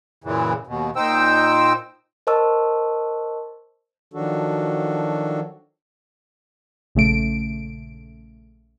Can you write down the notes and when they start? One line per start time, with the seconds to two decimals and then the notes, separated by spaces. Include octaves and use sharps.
0.24 F#2 A#2 C#3 E3
0.67 D#2 B2
0.96 A#2 D#4 C5 G5 E6
2.27 A#4 C5 D#5 A5 C#6 E6
4.14 D#3 F3 F#3 D4 F#4 A4
6.95 A#1 C#3 A3 D7